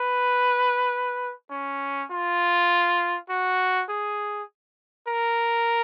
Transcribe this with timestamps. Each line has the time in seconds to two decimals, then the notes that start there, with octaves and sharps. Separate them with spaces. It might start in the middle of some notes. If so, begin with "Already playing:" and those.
Already playing: B4
1.51 C#4
2.11 F4
3.30 F#4
3.90 G#4
5.08 A#4